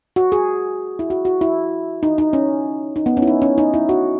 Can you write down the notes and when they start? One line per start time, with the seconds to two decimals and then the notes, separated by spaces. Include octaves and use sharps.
0.16 F#4
0.32 G#4
0.99 E4
1.10 F#4
1.25 F#4
1.41 E4
2.03 D#4
2.18 D#4
2.33 C#4
2.96 D#4
3.06 B3
3.17 C#4
3.22 E4
3.27 D#4
3.42 C#4
3.58 D#4
3.74 E4
3.89 F#4